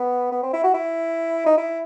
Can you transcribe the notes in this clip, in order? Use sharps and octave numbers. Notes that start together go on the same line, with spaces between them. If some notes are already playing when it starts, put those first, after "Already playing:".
Already playing: B3
B3
C4
E4
F#4
E4
D#4
E4